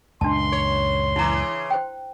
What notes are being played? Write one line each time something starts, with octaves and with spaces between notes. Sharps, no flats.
C#2 F#2 A#2 D4 A5 C6
C#5
C#3 E3 E4 A#5
C5 G5